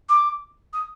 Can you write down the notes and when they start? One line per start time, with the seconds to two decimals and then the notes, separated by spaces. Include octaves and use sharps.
0.09 D6
0.73 D#6